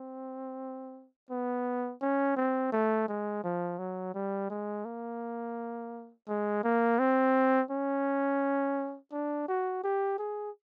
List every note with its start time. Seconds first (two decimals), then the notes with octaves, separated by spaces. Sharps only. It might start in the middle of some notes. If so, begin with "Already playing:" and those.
Already playing: C4
1.30 B3
2.02 C#4
2.36 C4
2.73 A3
3.08 G#3
3.44 F3
3.79 F#3
4.14 G3
4.50 G#3
4.85 A#3
6.28 G#3
6.64 A#3
6.99 C4
7.71 C#4
9.12 D4
9.48 F#4
9.84 G4
10.19 G#4